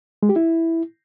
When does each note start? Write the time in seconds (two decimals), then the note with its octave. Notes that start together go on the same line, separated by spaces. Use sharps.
0.23 G#3
0.29 G4
0.36 E4